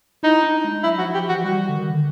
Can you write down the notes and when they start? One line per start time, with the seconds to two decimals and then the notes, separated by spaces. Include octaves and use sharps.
0.23 D#4 E4
0.43 D4
0.64 G#3
0.84 F#3 E4
0.98 F3 F#4
1.14 F3 G4
1.29 E3 F#4
1.44 G3 F#4
1.69 D3
1.75 D#3
1.90 D3